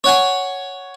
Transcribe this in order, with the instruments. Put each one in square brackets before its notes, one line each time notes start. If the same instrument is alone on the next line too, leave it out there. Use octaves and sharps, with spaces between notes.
[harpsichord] C#5 F#5 G#5